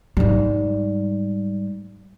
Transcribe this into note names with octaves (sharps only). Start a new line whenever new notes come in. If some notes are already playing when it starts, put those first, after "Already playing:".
G#2 G3